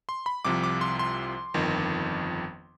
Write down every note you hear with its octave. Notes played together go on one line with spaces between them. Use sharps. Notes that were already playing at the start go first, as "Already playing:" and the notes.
C6
B5
C2 C3 F3 D6
D6
C6
C6
G1 F2 D#3